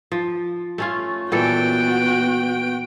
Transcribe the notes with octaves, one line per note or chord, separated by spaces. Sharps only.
F3
A3 C#4 F4
A#2 E3 B3 F#4 A4 G5 D7